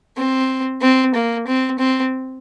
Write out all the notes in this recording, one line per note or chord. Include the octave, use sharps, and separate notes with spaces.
C4
C4
A#3
C4
C4